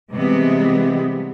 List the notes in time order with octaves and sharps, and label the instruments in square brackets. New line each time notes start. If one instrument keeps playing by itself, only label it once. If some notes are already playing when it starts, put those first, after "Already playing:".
[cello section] C3 E3 G3 G#3 B3